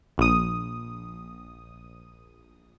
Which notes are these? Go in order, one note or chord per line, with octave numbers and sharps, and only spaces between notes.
A#1 D#6